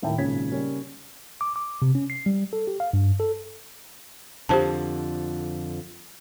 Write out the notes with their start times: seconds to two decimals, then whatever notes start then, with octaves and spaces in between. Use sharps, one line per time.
0.02 D#1 A2 D#3 E5 G5 A5
0.18 G#1 A#2 C#3 C#5 G#6 B6
0.52 C#3 G3 A#3 C#4
1.41 D6
1.56 D6
1.82 C3
1.95 C#4
2.10 C7
2.26 G3
2.53 A4
2.67 G4
2.80 F5
2.93 G2
3.20 A4
4.49 F2 D3 F3 G4 C5 A5